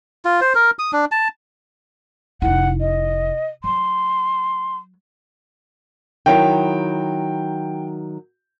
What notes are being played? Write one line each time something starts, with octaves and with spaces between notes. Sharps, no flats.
F4
C5
A#4
D#6
D4
A5
F1 E4 F#5
D#5
F#3 C6
D#3 F#3 E4 G5